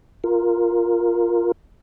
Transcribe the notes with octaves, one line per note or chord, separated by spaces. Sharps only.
F4 A#4